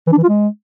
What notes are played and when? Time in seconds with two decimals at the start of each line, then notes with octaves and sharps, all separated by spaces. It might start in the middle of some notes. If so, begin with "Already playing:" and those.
0.07 E3
0.12 D4
0.18 E3
0.23 F4
0.29 G#3